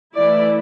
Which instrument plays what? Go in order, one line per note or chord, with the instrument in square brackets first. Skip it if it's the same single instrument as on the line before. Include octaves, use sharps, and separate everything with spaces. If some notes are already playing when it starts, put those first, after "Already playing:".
[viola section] E3 A3 E4 D5